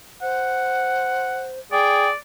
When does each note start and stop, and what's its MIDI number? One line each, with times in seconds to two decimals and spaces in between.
0.22 1.60 72
0.22 1.49 78
1.72 2.09 68
1.72 2.14 74
1.72 2.09 79